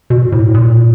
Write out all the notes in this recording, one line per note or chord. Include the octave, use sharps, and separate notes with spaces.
B2
A2
A#2